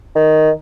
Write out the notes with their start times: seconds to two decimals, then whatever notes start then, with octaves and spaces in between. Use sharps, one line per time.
0.15 D#3